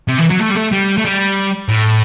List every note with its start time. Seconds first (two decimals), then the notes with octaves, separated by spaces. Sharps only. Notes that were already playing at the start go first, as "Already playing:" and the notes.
0.09 C3
0.19 E3
0.31 F#3
0.41 A3
0.51 G3
0.57 A3
0.73 G3
0.98 A3
1.05 G3
1.69 A2